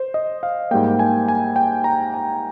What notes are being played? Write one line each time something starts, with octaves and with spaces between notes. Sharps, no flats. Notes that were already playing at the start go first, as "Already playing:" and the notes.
Already playing: C5
D#5
F5
G#2 G3 A#3 G5
G#5
G#5
G5
A#5
G#5